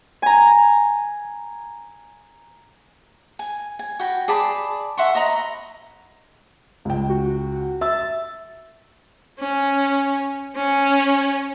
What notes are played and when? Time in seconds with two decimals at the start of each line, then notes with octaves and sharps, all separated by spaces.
0.22 G#5 A#5
3.39 G#5
3.79 G#5
3.99 F#4 G5 B5
4.28 G#4 D5 A5 B5
4.97 E5 F#5 C6 C#6
5.15 D#5 A#5 B5
6.85 C#2 G5
7.09 F#4
7.81 E5 E6 A6
9.40 C#4
10.56 C#4